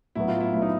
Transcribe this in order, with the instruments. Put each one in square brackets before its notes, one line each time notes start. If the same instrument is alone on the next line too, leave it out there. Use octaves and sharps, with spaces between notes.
[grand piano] A2 F#3 B3 [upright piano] E4
[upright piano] F4
E4
[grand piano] A2 F#3 B3 [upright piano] E4
[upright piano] D#4